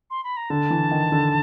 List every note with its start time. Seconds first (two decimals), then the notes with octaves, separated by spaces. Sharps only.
0.10 C6
0.24 B5
0.37 A#5
0.50 D3 A5
0.70 E3
0.91 D#3
1.12 D3